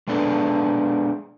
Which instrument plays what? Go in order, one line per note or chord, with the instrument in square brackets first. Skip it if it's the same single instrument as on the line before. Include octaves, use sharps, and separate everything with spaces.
[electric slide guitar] G#3 B3 D4 A4